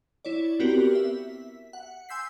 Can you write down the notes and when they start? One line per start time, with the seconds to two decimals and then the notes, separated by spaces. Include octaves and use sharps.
0.25 E4 C#5 D5
0.60 B3 C4 F#4 G4 A#4
0.95 E5
1.73 F#5
2.09 G#5 C6 E6 G6 B6 C7